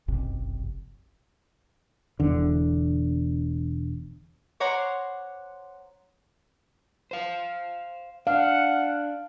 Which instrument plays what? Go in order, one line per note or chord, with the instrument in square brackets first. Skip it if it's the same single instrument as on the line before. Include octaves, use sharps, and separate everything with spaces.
[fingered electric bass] F#1 B1 F2 C3
[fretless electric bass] E1 E2 D3
[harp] C5 C#5 F#5 A#5 C6 D6
[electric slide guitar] C5 F5
[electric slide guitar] D4 [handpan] F5 [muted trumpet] F#5